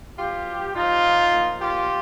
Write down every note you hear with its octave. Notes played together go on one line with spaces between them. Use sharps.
B2 F#3 F4 G4
A#2 F3 D#4 F4
A#2 F3
F4 G4